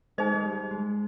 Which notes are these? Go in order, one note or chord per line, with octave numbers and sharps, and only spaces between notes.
G#3 D#4 G#4 C5 D#5
G#3
G3
G#3